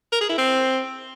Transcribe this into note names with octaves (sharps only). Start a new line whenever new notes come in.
A#4
G#4
E4
C4